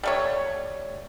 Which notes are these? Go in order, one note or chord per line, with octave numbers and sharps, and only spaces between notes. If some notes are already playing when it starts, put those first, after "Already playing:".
G3 A3 C#5